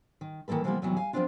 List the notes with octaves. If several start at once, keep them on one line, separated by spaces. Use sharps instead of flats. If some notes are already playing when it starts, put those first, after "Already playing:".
D#3
D#3 E3 A#3 A4 B4
C3 E3 F3 G3 A#3 B3
E2 C3 D#3 E3 F#3 B3
F5 G#5
F3 A3 B3 C4 D4 F4